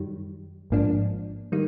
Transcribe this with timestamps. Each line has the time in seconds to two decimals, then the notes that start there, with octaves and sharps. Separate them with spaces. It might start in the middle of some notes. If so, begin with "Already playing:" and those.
Already playing: F#2 D#3 G3
0.70 A1 G#2 F3 A#3 D4
1.52 D#3 G3 A#3 D#4